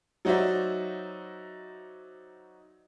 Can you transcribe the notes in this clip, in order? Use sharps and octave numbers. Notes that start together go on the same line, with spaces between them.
F#3 D#4 F#4 C5 D5 E5